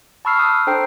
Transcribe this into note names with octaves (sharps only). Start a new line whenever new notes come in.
A5 B5 C#6 E6 F6 C7
A5 D#6 F#6
D4 A4 C5 G5 A#5 C7